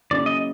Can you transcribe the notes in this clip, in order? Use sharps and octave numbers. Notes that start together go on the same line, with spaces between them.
C#3 F#3 A#3 C#4 E4 D5
D#5